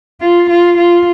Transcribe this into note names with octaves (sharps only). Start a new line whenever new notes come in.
F4
F4
F4